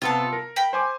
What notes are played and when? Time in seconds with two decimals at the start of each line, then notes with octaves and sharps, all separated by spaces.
0.02 C3 B3 F4 A4 A5
0.33 A#4
0.56 G5 B5
0.73 C5 G#5 D6